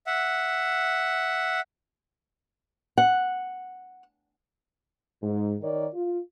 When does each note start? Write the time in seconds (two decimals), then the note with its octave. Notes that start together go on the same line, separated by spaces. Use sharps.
0.07 E5 F#5
2.98 F#5
5.20 G#2
5.62 D#3 A#4 C#5 D5
5.94 F4